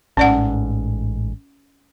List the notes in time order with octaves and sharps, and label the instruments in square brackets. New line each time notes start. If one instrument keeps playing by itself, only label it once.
[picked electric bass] A1 G#2 [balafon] C#4 D5 F#5